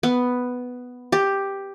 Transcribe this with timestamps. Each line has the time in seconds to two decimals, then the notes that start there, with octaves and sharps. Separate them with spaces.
0.03 B3
1.12 G4